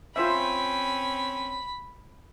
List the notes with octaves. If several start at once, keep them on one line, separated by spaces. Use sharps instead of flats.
C4 C#4 F4 C5 E5 B5